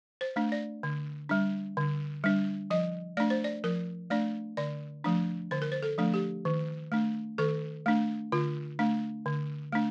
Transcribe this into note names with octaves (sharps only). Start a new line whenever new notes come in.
C5
A3 D4
D5
D3
G3 D4
D3
G3 D4
F3 D#5
A3 D4 D5
C5
D5
F3 A#4
A3 D4 D5
D3 D5
F3 A3 D4
D3 C5
A#4
C5
A4
F3 A3 D4
G4
D#3
A3 D4
D#3 A4
A3 D4
D3 F4
A3 D4
D3
A3 D4